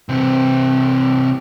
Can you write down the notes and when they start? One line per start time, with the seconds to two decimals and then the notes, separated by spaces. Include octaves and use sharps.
0.09 C3 E3